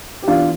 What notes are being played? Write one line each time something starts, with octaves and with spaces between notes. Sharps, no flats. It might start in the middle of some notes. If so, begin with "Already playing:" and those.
G4
E2 D4 F4